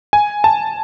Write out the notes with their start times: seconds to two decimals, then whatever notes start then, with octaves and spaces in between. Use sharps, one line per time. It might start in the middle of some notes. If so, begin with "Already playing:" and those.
0.13 G#5
0.44 A5